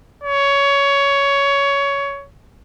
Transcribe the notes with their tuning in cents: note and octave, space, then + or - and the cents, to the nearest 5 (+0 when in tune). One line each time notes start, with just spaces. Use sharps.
C#5 +15